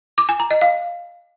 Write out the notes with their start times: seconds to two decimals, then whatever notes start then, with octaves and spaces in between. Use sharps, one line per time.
0.18 D6
0.29 G#5
0.40 A#5
0.51 D#5
0.61 F5